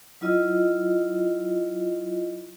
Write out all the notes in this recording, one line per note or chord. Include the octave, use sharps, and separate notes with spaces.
F#3 E4 F4 D#5